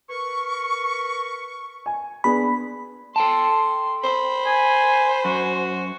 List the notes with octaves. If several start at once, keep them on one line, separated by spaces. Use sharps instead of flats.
A#4 B4 C#6
G#5
B3 D4 G#4 B5
A4 G5 A5 C6
C5 B5
G#5
F#2 F#4